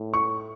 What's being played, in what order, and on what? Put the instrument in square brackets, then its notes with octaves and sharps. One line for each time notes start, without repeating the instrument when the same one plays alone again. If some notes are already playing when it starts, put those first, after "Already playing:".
Already playing: [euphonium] A2
[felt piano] C#6